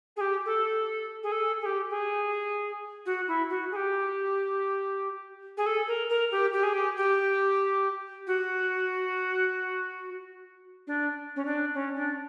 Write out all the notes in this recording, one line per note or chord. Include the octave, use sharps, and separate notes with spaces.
G#4
G4
A4
G#4
A4
G#4
G4
G#4
F#4
E4
F#4
G#4
G4
G#4
A4
A#4
A#4
G4
G4
G#4
G4
G4
F#4
D4
C#4
D4
C#4
D4